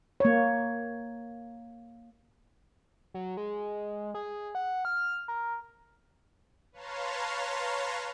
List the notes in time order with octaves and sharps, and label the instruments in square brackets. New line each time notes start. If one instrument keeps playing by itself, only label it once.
[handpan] A#3 C#5
[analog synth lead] F#3
G#3
G#4
F#5
F6
A#4
[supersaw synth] B4 C#5 F5 A5 A#5 C6